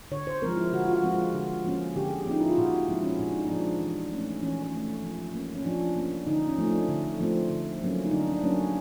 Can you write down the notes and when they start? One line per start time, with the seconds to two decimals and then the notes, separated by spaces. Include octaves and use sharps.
0.12 D3 C#5
0.27 C5
0.42 F3 G#3 C4 A#4
0.57 E4
0.73 D3 F#4
0.85 F4
0.93 F#4
1.03 F3 G#3 C4
1.14 F4
1.34 D3
1.65 F3 A#3 C#4
1.96 D3 G4
2.07 G#4
2.21 G4
2.26 F3 A#3 C#4 D#4
2.40 E4
2.49 F4
2.57 A#2 F#4
2.73 F4
2.88 F3 G#3 C4 E4
3.03 C#4
3.19 A#2 D4
3.32 D#4
3.47 F3 G#3 C4 D4
3.81 E3
4.12 A3 C#4
4.42 E3 C#4
4.63 C#4
4.74 A3 C#4
5.03 F3
5.34 A#3 C#4
5.56 C#4
5.65 F3 D4
5.96 A#3 C#4
6.27 D3 D#4
6.48 C#4
6.58 F3 A3 C4
6.68 D4
6.89 D3
7.19 F3 A3 C4
7.50 D3
7.81 F#3 A#3 C#4
8.06 D#4
8.11 D3 D4
8.32 D4
8.43 F#3 A#3 C#4